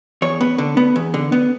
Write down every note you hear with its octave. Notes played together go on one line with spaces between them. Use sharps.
E2 C#5
B3
D3
B3
E2
D3
B3